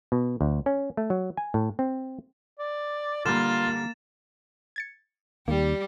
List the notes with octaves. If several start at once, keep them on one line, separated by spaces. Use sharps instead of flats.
B2
D2
C#4
A3
F#3
G#5
A2
C4
D5
D3 G3 A#3 F4 A6 E7
G#6 A6 C#7
D#2 G3 A#3 G4